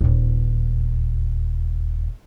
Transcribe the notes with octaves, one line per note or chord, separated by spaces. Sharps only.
D#1 E2